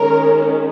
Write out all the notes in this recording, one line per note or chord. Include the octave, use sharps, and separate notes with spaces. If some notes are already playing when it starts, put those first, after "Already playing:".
Already playing: D#3 G#3 C#4 A#4